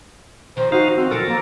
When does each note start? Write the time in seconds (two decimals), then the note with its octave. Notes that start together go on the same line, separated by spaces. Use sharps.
0.57 D#3 F3 C5
0.72 D#4 F#4 F5
0.98 C4 F#4
1.11 D3 F3 F#3 A4 A#4
1.27 A#3